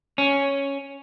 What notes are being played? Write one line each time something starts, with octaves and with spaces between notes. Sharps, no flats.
C#4